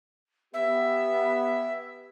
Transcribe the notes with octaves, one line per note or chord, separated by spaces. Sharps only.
B3 G4 E5